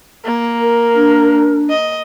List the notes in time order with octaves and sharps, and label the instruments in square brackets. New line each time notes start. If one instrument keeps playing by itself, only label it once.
[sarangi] A#3
[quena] A#4
[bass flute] D4
[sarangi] D#5